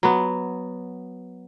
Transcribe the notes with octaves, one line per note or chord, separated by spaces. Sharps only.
F#3 B3